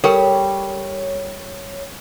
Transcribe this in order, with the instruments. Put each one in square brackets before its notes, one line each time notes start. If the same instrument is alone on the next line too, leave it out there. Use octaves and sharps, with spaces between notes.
[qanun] G3 [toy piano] A4 A#4 G5 [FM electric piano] C#5